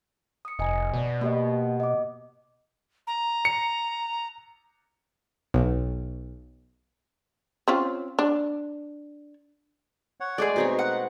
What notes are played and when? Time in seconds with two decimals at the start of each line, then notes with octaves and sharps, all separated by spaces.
0.45 D#6 C#7
0.59 F1 D#5 G#5 A#5
0.93 B2 D5
1.21 A#3 G4 D#5
1.80 D#5 D6
3.07 A#5
3.45 C#7
5.54 B1
7.68 C4 C#4 F4
8.19 D4
10.20 C#5 F#5
10.38 G#3 A3 G#4 D5
10.56 B2 C4 D#4 C#5
10.79 F#5